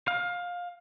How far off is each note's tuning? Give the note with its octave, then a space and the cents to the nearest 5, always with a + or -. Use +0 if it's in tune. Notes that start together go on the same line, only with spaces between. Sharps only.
F5 +20